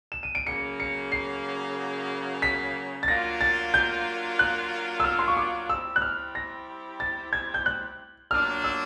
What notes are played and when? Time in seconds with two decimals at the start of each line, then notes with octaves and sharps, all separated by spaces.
0.12 E7
0.23 D#7
0.35 D7
0.46 C#3 F#3 A#3 C#7
0.80 C#7
1.12 C7
2.42 B6
3.03 A6
3.08 F#3 A#3 D4 F4 A#6
3.41 A6
3.74 G6
4.39 F#6
5.00 E6
5.04 F6
5.19 C6
5.28 C#6
5.37 D6
5.69 G3 C4 E4 G4 E6
5.96 F#6
6.02 F6
6.35 A#6
7.00 A6
7.33 G#6
7.54 G6
7.66 F#6
8.31 A#2 F#3 A#3 D4 F6
8.64 E6